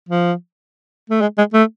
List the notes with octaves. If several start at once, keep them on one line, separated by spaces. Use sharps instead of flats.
F3
A3
G#3
G#3
A3